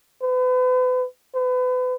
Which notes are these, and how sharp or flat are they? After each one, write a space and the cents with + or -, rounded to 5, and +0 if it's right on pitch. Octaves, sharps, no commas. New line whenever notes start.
B4 +40
B4 +35